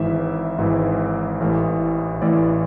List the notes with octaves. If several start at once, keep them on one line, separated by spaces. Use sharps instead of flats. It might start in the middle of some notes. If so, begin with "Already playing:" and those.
Already playing: G#1 G#2 E3 E5
G#1 G#2 E3
A1 A2 E3
A1 A2 E3 D5